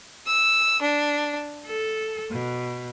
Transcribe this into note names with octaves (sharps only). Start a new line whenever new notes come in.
E6
D4
A4
B2